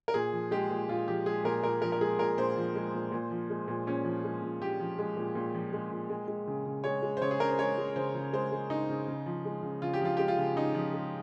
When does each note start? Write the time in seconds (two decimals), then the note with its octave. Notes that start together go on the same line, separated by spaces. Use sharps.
0.08 A#4
0.14 A#2 G#4
0.33 F3
0.51 G#3 G4
0.70 A#2
0.89 A#2 F4
1.08 F3 G4
1.26 G#3 G#4
1.44 A#2 A#4
1.63 A#2 A#4
1.82 F3 A#4
1.92 A#4
2.01 G#3 G#4
2.19 A#2 A#4
2.38 A#2 C5
2.57 F3
2.75 G#3
2.94 A#2
3.12 A#2
3.31 F3
3.50 G#3
3.68 A#2
3.87 A#2 C#4
4.05 F3
4.24 G#3
4.42 A#2
4.60 A#2 G4
4.80 F3
4.99 G#3
5.17 A#2
5.35 A#2
5.55 F3
5.73 G#3
5.91 A#2
6.10 G#3
6.28 G#3
6.47 C#3
6.65 C#3
6.84 G#3 C#5
7.03 G#3
7.17 C5
7.21 C#3 C#5
7.31 G#4
7.40 C#3 A#4
7.49 C5
7.59 G#3 C#5
7.78 G#3
7.96 C#3 C5
8.15 C#3
8.33 G#3 C5
8.52 G#3
8.70 C#3 D#4
8.89 C#3
9.08 C#3
9.26 F3
9.45 G#3
9.63 C#3
9.82 C#3 F4
9.93 G4
10.01 F3 F4
10.17 G#3 G4
10.28 F4
10.38 C#3
10.56 C#3 D#4
10.74 F3
10.93 G#3